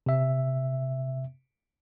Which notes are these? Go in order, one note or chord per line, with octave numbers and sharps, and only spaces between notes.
C3 E5